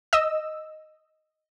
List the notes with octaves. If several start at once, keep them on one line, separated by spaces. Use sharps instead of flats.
D#5 E6